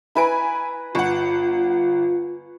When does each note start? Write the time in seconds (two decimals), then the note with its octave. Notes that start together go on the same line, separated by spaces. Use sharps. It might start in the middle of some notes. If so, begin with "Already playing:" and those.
0.15 E4 B4 G#5 A#5 B5 D7
0.95 G1 F4 F#5 G#5 C#6